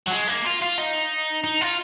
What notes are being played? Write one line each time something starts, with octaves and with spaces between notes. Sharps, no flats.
F#3
G#3
A#3
F4
F4
D#4
D#4
F4